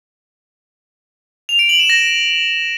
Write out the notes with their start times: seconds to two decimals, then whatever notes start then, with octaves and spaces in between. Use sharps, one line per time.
1.49 F7
1.59 D7
1.69 F#7
1.79 E7
1.90 A#6